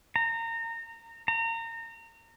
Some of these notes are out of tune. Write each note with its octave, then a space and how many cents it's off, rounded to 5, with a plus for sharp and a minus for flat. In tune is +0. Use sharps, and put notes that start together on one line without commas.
A#5 -25
A#5 -30